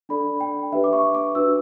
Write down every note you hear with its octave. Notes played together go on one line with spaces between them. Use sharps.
D4 A4 D5 B5
G5
D4 G4 B4 E5
D6
C#6
D6
D4 F#4 B4 E6